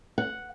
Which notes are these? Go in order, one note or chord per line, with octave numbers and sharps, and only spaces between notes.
F#5